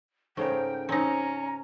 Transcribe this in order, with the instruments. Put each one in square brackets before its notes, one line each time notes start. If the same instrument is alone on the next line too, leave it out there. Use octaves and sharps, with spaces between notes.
[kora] G#2 C#3 A#4 [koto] A3 [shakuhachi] G5
[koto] C4 D#4 [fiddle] C#4 [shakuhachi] A#5